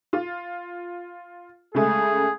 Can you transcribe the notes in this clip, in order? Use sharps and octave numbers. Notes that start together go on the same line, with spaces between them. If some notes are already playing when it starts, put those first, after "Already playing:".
F4
C#3 G#3 A3 G#4